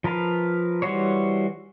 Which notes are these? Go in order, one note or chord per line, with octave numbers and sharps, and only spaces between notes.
F3 A#4 B4 F5
E3 G3 F#4 C5 C#5